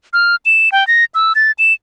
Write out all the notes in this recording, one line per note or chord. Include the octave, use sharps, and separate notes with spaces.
F6
E7
G5
A#6
E6
A6
E7